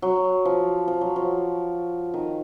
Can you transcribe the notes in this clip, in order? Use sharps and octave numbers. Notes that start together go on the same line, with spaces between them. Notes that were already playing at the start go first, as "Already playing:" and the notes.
F#3
F3
F3
F#3
F3
D#3